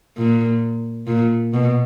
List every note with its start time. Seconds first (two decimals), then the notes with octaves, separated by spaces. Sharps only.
0.17 A#2
1.07 A#2
1.53 B2